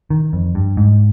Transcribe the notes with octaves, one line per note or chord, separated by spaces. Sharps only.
D#3
F2
G2
G#2